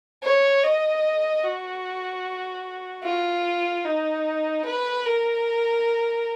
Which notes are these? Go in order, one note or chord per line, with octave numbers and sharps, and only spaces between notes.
C#5
D#5
F#4
F4
D#4
B4
A#4